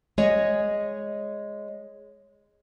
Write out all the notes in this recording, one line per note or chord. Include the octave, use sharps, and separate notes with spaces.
G#3 C#5 D#5